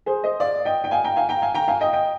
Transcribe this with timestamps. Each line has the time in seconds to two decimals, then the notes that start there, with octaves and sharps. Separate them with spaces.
0.06 G#4 C5
0.24 C5 D#5
0.40 D5 F5
0.65 D#5 G5
0.84 G5
0.91 F5 G#5
1.04 G5 A#5
1.16 F5 G#5
1.29 G5 A#5
1.42 F5 G#5
1.55 G5 A#5
1.68 F5 G#5
1.81 D#5 G5
1.93 D#5 G5